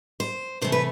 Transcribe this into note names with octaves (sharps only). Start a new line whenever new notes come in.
C5
C3 E3 A3 C5
B4